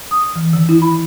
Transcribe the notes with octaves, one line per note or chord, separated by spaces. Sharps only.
D#6
E3
D#3
E4
B5